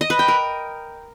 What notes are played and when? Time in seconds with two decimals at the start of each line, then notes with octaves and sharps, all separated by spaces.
0.01 D#5
0.10 B4
0.19 G5
0.28 A#4